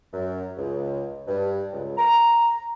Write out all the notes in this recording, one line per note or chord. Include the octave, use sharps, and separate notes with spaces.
F#2
C#2
G2
C#2
A#5